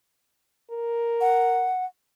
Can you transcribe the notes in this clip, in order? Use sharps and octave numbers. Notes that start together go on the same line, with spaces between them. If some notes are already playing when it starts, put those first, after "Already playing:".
A#4
F#5